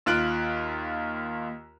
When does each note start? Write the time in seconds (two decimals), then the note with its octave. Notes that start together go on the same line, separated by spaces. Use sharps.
0.06 D#2 F4 F#6 D7